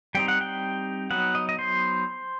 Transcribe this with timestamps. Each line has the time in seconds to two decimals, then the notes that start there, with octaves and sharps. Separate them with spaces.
0.15 G3 C4 D#4 G5
0.28 F#5
0.41 G5
1.11 F#3 B3 D#4 F#5
1.35 D#5
1.49 D#5
1.59 C5